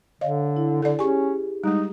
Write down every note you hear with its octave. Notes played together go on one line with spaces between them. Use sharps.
D3 C#5 D#5 F5
E4
D3 A4 D5
C#4 G4 G#4 G#5 C#6
G3 G#3 D#4